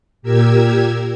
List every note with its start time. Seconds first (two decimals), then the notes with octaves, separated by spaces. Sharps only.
0.22 A#2 G4 A#4 E6 G#6